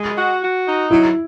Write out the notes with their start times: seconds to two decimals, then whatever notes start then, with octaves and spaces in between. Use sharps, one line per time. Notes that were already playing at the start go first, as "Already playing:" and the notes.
Already playing: G#3
0.16 F#4
0.41 F#4
0.67 D#4
0.90 F#3 E4